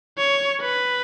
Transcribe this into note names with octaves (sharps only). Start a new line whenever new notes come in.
C#5
B4